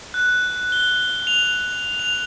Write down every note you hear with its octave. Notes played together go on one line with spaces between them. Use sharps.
F#6
G7
F7
F7